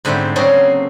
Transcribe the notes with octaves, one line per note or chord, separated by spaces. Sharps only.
G#2 D3 G3 A3 C4
C#3 F#3 A#3 C4 C#4 A4